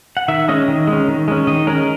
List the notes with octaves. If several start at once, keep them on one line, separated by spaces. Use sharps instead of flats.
F#5
D#3 E5
G#3 C#4 D#5
D#3
G#3 C#4
D#3
G#3 C#4
D#3 D#5
G#3 C#4 A#4